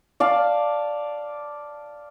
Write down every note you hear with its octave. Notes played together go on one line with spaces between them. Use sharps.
D5 F5 A5